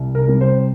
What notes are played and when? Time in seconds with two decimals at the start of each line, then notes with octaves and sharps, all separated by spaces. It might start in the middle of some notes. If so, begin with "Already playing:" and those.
Already playing: C2
0.15 A#4
0.28 C3 G3
0.41 C5